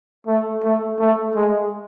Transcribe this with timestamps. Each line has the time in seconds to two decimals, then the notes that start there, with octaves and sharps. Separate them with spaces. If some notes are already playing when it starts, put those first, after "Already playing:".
0.27 A3
0.63 A3
0.99 A3
1.35 G#3